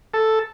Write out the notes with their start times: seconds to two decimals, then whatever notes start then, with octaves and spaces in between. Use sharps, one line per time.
0.14 A4